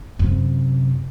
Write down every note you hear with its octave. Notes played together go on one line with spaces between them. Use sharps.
F#2 C3